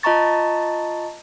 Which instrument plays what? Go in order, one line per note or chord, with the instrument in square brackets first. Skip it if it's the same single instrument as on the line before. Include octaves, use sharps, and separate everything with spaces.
[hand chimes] F4 D#5 A5 A#5 C#6 A6